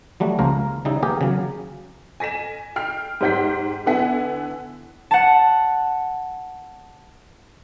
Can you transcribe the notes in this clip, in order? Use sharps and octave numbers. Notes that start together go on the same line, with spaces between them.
F#3 G3 A3 F#4
C#2 F3 A#3 A#4
C#3 G3 D#4 E4
A#3 B3 G4 G#4 A#4
C#3 F#3
G#5 A#6 B6 E7
G5 F6 C7
G#2 G4 C5 F#5 G6 B6
D3 B3 E4 F#5 G#5 B6
F#5 A5